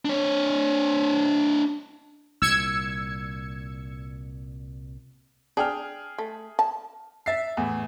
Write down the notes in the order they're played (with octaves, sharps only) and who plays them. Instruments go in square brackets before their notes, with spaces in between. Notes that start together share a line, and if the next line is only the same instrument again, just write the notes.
[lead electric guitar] D4 C#5
[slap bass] C2 A#2 [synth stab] E6 G#6 C#7
[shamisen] D4 [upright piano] G#4 G5 F6
[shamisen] A3
A5
[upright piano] E5 A6 C7
E2 A2